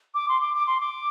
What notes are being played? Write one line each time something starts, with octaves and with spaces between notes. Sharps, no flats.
D6
C6
D6
D6
C6
D6